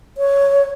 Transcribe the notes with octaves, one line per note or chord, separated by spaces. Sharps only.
C#5